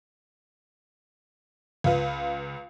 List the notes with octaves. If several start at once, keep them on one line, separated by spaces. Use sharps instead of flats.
C#2 F4 B4